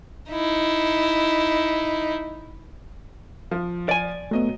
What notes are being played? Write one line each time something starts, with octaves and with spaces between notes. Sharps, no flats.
D#4 E4
F3
D5 G#5
F#3 A3 B3 D#5 D#7